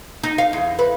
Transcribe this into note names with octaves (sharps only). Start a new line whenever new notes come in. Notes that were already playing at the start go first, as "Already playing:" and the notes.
D#4
F5
E2
B4